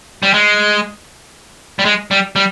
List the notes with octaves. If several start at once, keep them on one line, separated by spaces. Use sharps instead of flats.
G3
G#3
G3
G#3
G3
G3